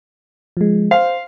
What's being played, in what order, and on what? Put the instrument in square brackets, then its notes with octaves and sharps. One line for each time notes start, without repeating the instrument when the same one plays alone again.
[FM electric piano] F3 G#3
[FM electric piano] C5 [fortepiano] F5